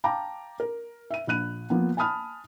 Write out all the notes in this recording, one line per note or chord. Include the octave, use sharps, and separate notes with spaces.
F5 G5 A5 A#5 D6
A#4
E5 D#7
A#1 B5 F#6 D#7
F3 A#3 B3
G#5 A5 B5 D#6 F6